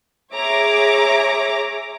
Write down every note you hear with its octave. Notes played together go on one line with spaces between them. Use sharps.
G#4 C#5 E5 A#5 D6